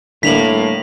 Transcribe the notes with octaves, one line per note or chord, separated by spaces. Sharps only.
A2 D3 G3 A#3 D4 B6 F7 F#7